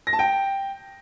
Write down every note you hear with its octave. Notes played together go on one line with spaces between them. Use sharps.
A#6
A5
G5